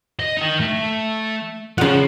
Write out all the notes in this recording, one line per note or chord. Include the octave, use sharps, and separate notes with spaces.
D#5
D#4 G5
A3
C#3 F4 C5 F#5